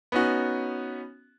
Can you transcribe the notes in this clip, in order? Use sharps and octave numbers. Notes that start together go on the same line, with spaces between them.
B3 C#4 D#4 F#4